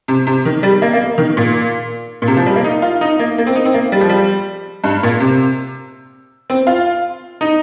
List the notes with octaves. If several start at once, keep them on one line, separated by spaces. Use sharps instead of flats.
C3
C3
D#3
G3
A#3
A#3
D#3
A#2
A#2
C3
F3
G3
A#3
D#4
F4
D#4
A#3
A#3
C4
D#4
C4
A#3
G3
F3
G3
G2
A#2
C3
C4
F4
D#4